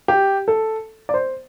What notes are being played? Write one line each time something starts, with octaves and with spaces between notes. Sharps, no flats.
G4
A4
D5
C5